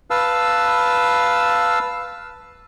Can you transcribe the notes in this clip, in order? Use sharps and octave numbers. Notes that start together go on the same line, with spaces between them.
B4 F5 A5 E6